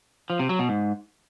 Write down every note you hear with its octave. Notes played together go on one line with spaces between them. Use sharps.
F3
C3
F#3
B2
G#2